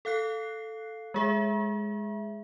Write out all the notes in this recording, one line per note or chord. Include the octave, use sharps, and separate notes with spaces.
A4 F5 F#6 C7
G#3 G#4 E5